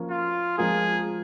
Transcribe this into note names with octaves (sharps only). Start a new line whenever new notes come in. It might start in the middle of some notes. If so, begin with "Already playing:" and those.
Already playing: F3 A#3 C#4
F4
F3 G#3 F4 G#4 A#4